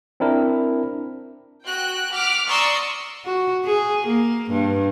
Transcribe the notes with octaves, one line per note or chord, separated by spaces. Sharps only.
C4 D4 E4 A#4
F#4 G5 F#6
F#5 D6 F6 B6
D5 A#5 C6 C#6 D#6 E6
F#4
G#4
A#3
G2